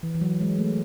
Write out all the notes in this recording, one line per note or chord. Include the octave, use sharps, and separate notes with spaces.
E3
E3
F#3
G#3
A3